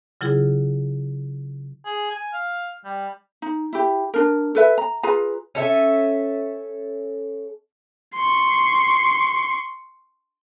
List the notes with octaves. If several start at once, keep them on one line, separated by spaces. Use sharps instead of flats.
C#3 F#3 E4 F4 G#4
G#4
G#5
F5
G3
D#4
E4 G4
D4 A#4
A4 B4 E5
A#5
F4 G#4 B4 A#5
C#4 A4 E5
C6 C#6